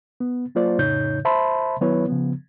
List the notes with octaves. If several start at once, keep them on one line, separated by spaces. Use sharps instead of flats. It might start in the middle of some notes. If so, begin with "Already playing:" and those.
B3
F#3 A#3 F4 C5 D5
F2 A2 C#3 D#4 C#5 G6
C5 E5 A5 B5 C6
D#3 F#3 B3 E4 B4 C#5
C#3 F3 B3